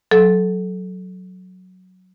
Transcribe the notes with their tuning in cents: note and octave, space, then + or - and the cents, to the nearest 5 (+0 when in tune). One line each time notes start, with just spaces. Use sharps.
F#3 +0 A4 -20